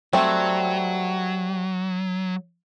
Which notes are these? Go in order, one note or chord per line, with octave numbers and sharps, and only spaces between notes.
F#3 G3 A3 C4